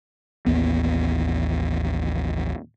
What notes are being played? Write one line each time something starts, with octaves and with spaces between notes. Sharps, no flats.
A1 D#2 B3